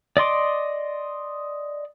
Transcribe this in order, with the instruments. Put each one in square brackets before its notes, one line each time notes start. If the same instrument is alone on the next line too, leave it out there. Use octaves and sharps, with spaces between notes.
[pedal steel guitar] D5 D#5 C6 D6